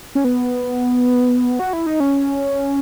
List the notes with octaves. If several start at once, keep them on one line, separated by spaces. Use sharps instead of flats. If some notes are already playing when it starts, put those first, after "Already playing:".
C#4
B3
F#4
E4
D#4
C#4